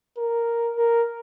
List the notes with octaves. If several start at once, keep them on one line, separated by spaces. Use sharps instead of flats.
A#4
A#4